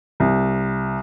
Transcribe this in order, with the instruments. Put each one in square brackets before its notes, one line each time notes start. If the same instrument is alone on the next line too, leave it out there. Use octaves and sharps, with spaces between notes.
[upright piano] C2